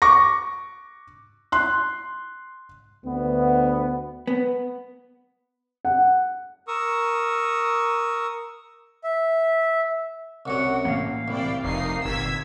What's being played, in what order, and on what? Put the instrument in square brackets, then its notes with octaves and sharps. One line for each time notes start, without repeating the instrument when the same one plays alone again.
[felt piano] C#6 D6 A#6
C6 F#6
[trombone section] D2 B3
[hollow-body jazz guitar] B3
[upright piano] F#5
[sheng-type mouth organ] A#4 C#6 D#6 E6
E5
[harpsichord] C2 F#2 F#3 [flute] F#5
[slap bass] A2 E3 A#3 [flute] F5
[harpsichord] C2 [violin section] E4 D5 G5
[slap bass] F1 F2 [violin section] A#3 D#4 C7
[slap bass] G1 A#2 [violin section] E6 G#6 B6